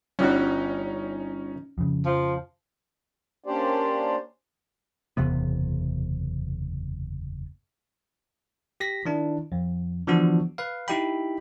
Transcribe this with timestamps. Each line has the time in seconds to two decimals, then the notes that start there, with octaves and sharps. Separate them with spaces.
0.19 G1 G3 C#4 D#4 F#4
1.78 F2 C#3
2.05 F3
3.44 A#3 C#4 D4 G4 C5 D5
5.17 F#1 E2 C3 B3
8.80 G4 A#6 B6
9.05 D#3 D4 E4
9.52 F2
10.07 D3 E3 F3 B3 D4 F#4
10.58 B4 F5
10.88 D#4 E4 G4 D#5 G5 B5